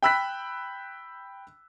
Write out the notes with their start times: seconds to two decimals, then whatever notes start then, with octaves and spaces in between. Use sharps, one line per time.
0.03 G5 B5 E6 F#6 B6